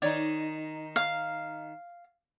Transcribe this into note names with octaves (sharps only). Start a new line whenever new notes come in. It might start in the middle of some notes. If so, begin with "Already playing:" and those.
D#3 D#4 C#5 D5
F5